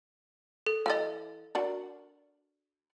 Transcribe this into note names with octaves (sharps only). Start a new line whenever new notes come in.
A4
E3 A4 D#5 F5 A6
D4 F#4 A#4